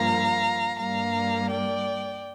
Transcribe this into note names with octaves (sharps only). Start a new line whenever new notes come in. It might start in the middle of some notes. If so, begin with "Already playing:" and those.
Already playing: G2 F3 A#3 F5 A#5
G2 G3 A#3 F5 A#5
D5 G5